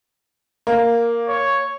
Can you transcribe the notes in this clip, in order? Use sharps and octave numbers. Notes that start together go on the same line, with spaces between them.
A#3
C#5